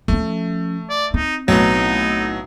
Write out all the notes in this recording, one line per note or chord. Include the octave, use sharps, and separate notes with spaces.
F3 A3 C#4
D5
C4 D#4
B1 A2 F#3 B3 D#4